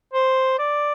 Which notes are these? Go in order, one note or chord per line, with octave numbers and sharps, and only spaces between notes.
C5
D5